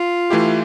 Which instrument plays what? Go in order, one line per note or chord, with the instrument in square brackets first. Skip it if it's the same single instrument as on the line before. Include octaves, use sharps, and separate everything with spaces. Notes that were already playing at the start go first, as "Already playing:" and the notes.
Already playing: [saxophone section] F4
[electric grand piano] E3 A3 E4 G4